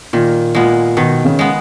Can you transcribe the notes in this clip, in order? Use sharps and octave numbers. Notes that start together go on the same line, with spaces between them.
A#2 D#3
A#2 G#3 B3
B2 D#3
C#3
G#3 B3